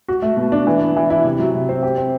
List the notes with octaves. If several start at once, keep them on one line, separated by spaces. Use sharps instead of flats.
F#4
A3
B2
D4
E3
B3
E3
E4
C3
F#3
C3
C4
G4
C4